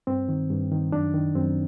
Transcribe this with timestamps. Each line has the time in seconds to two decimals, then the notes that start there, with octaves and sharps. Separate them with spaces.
0.07 G2 C4
0.28 D#3
0.50 G2
0.71 D#3
0.92 F#2 D4
1.14 D#3
1.35 F#2 C4